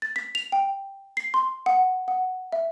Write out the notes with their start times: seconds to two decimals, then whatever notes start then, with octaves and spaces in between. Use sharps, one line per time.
0.02 A6
0.16 B6
0.35 F7
0.52 G5
1.17 C7
1.34 C6
1.66 F#5
2.08 F#5
2.52 E5